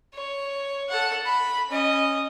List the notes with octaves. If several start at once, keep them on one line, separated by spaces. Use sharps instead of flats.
C#5
A4 F#5
B5
C#4 D#5